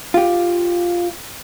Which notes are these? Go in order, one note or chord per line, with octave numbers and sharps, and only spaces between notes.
F4 G4